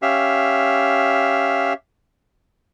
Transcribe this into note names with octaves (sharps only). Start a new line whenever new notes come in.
C#4 G4 E5 F5